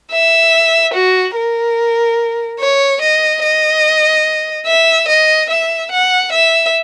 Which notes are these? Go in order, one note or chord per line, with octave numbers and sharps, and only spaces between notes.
E5
F#4
A#4
C#5
D#5
D#5
E5
D#5
E5
F#5
E5